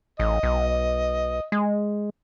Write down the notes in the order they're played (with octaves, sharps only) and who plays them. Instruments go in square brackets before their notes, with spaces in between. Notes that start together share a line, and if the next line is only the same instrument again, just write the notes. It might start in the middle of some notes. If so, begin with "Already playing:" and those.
[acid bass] A1 [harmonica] D#5
[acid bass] B1
G#3